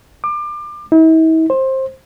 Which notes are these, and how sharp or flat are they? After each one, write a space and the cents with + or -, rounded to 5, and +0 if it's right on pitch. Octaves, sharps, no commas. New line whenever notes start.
D6 +30
E4 -45
C5 +20